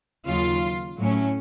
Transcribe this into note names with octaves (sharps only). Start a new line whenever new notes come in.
D#2 C#3 F#3 F4
A2 F#3 A3 C#4